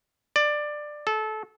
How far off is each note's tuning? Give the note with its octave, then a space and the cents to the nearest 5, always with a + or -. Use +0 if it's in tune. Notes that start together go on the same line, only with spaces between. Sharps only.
D5 +15
A4 -25